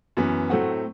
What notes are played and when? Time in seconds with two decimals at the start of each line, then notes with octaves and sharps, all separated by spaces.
0.17 F#2 E3 B3
0.50 A2 F#3 A3 C4 F#5